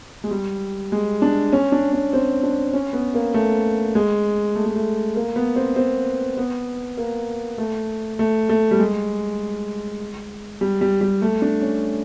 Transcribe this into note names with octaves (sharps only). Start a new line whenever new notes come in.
G#3
G3
G#3
D4
C#4
D4
C#4
C4
D4
C#4
B3
A#3
A3
G#3
A3
G#3
A3
A#3
B3
C4
C4
B3
A#3
A3
A3
A3
G3
G#3
G3
G3
G3
A3
D4
C#4